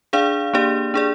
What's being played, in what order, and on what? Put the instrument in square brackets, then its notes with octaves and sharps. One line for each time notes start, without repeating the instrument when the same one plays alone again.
[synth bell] D4 G#4 D5 F5
A#3 D4 G4 D5
D4 G#4 D5